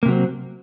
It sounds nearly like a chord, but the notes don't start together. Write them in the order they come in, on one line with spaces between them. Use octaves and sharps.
A#3 C3 F#3 C4